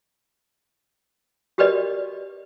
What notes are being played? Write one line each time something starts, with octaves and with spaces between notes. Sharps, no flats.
F#4 G4 A#4 B4 D5 D#5